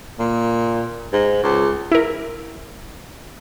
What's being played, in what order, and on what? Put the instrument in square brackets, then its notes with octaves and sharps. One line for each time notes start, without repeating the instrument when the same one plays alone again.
[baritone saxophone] A#2
G#2
C#2
[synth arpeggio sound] E4 A#4